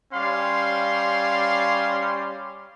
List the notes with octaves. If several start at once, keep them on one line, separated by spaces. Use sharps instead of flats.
G3 C#4 F5 C6